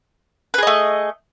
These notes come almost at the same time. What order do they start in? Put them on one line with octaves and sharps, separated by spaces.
B4 G#4 D#5 A3